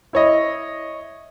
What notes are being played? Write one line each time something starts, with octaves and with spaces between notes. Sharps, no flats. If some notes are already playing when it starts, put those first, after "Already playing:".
E4 C#5 D#5